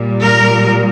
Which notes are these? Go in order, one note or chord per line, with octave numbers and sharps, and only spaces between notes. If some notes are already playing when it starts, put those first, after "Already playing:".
Already playing: A#2 G3
A#4